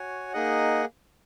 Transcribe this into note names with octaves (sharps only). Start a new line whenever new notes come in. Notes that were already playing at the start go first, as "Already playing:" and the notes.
Already playing: F#4 C#5 G#5
A#3 D#4 G#4 D#5 F#5